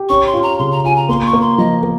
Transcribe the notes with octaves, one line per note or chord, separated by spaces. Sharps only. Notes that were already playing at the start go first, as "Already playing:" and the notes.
Already playing: G4
C#4 C#6
C6
F4
A#5
C#3 C6
A#5
F4 G#5
A#5
A#3 C6
C#6
A#3
C6
F3 D#5
A#3